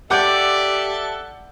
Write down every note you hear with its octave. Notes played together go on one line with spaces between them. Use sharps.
G4 A4 D5 E5 F#5 D6 G6